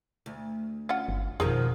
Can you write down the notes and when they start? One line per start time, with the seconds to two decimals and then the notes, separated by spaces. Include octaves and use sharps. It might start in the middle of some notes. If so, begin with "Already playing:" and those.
0.26 D2
0.89 C#4 F4 F#5
1.08 G1
1.40 F2 B2 D#3 F3 G#4 A#4